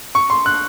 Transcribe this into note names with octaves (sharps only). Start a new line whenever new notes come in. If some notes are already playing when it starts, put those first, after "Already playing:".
C#6
C6
F#6